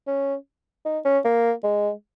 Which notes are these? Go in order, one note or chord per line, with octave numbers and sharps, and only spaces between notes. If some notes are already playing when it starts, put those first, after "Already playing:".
C#4
D#4
C#4
A#3
G#3